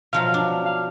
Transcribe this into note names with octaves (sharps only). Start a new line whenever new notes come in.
B2 F3 F#3 F5
D4
F5